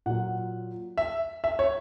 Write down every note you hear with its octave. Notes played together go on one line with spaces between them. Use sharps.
A#2 F#3 F#5
E5
E5
C#5